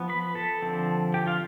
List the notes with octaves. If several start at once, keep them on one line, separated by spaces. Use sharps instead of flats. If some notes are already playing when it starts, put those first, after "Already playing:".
Already playing: F3 B3
B4 B5
A4 A5
D3 F3 C4
G4 G5
F4 F5